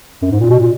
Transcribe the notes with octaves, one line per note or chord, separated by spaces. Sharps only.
F#2
G#2
A#2
B2
A#2